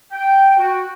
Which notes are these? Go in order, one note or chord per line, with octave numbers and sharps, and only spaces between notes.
G5
F#4